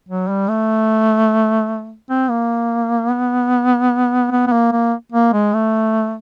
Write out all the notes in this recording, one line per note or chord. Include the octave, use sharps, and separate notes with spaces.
F#3
G3
A3
C4
A#3
B3
B3
B3
A#3
A#3
A#3
G#3
A3